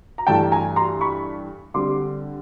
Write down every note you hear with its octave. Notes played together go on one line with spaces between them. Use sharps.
A#5
G2 E3 A3 D4 G5 A5
G#5 A#5
A#5 C6
B5 C#6
D3 G3 C4 C6 D6